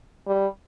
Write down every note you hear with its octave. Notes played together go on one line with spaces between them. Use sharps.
G3